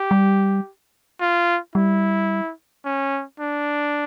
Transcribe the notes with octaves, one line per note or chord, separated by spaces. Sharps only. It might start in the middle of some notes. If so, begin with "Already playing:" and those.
Already playing: G4
G3
F4
G3 E4
C#4
D4